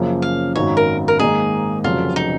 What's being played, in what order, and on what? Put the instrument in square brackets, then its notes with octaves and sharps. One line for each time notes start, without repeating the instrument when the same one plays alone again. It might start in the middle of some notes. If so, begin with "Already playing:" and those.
Already playing: [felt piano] F#2 C#3 F3 A#3
[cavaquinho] F5
[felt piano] G#1 F#2 D#3 F#3 [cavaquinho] C#5
[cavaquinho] A#4
A#4
[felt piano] G#2 D#3 A#3 D#4 [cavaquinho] G#4
[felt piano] F1 F2 C#3 F#3 [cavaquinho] F4
[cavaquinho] D#4